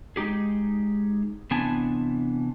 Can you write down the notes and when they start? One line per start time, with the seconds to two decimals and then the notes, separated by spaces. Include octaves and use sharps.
0.16 G#3 D#4 G4 G#4
1.51 C3 E3 B3 D4 G#5 A5